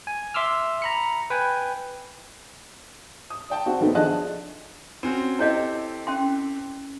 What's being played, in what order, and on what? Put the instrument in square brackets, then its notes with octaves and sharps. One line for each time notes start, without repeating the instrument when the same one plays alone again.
[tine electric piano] G#5
E5 C6 D6 E6 F6
A#5 B5 C#7
B4 G5 G#5
[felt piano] D#6
D5 G5 A5
C4 F#4
D#3 F#3 A3 B3 C4
F3 D4 G#4 D#5 A5 F#6
[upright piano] C4 C#4 F#4
[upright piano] C4 G4 A4 [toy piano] E4 C#5 D#5
[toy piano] C#4 G5 C6